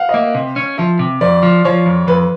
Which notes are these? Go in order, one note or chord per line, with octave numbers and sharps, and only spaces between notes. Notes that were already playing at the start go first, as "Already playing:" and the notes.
Already playing: F5 F#5
D#5
A#3 E5
C3
C#4
F3 E5
C3
F2 D5
F3
F3 C#5
F2
F2 B4